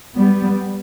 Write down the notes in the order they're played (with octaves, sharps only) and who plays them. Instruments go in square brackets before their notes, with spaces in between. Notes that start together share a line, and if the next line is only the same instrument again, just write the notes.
[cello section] G3 B3